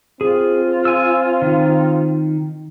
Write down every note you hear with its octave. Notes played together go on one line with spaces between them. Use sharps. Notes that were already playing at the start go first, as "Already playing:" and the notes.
C4 F4 G#4
G#5 E6
D#3